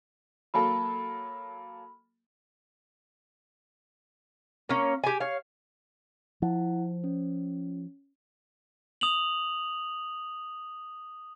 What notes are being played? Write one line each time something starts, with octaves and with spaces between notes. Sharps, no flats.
F#3 A#3 A4 B5
A#3 C#4
G4 G#5
C#5 F5
F3 E4 F#5
C#4
D#6 F7 F#7